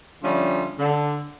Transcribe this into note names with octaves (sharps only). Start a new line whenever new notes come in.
D3 F3 G3 A3 C#4 F4
D3